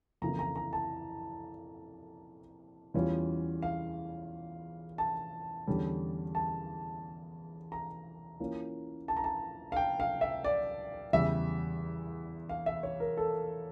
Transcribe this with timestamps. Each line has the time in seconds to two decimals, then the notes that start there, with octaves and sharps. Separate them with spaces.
0.22 F2 C#3 E3 A#3 E4 A#5
0.39 A#5
0.56 A#5
0.73 A5
2.94 E2 E3 G3 C#4 F4
3.62 F5
4.98 A5
5.67 E2 D3 G3 C#4
6.35 A5
7.72 A#5
8.40 E3 A#3 C#4 F4
9.08 A5
9.17 A#5
9.24 A5
9.72 F5
9.77 G5
10.00 F5
10.21 E5
10.44 D5
11.13 E2 C#3 G3 E5
12.49 F5
12.66 E5
12.83 C#5
13.00 A#4
13.17 A4